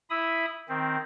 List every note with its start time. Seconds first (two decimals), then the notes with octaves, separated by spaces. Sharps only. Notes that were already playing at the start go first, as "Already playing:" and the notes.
0.10 E4 E5 B5 D#6
0.69 D#3 C4